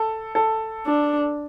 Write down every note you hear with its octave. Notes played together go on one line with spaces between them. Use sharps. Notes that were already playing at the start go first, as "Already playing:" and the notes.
Already playing: A4
A4
D4